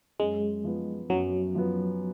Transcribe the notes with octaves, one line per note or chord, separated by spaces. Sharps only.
F#2 G#3
F3 B3
F#2 F#3
F3 B3